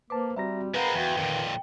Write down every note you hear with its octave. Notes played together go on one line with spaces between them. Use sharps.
A#3 B4 C5 A5 D6
G3 C4 F#4 E5 A#5 A#6
G#3 C4 A#4 B4 F5 F#5 A#5 B5
E2 F#4 G5
F2 A#2 D#3